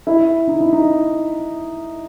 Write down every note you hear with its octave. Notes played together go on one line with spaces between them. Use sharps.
E4
D#4
E4
D#4